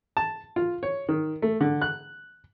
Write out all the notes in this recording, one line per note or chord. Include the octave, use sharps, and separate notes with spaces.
A5
F4
C#5
D#3
A3
D3
F#6